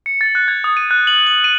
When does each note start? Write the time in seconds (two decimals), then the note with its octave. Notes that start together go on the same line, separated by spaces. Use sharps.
0.06 C#7
0.21 A6
0.35 F#6
0.48 G#6
0.64 D#6
0.77 D#7
0.91 F#6
1.07 F#7
1.27 F#7
1.44 D#7